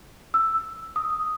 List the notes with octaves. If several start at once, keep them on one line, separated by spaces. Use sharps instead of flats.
E6
D#6